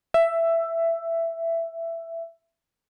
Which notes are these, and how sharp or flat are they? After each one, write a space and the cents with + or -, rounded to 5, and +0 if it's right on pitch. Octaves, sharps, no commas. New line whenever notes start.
E5 +10